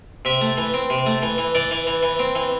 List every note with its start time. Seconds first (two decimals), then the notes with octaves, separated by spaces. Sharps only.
0.25 C3 E5
0.41 A3
0.57 E3
0.74 C4
0.90 C3
1.06 A3
1.22 E3
1.38 E3
1.55 E3 D5
1.71 E3
1.87 E3
2.03 E3
2.19 C4
2.35 E3